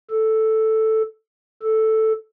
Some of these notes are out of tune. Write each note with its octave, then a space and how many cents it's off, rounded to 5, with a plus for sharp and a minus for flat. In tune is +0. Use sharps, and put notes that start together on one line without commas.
A4 +0
A4 +0